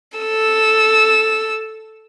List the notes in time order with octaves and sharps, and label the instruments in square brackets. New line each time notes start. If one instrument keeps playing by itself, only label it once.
[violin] A4 E6